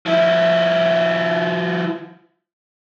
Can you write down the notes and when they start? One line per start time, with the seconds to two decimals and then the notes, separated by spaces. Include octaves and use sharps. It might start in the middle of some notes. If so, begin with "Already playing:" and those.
0.06 F3 E4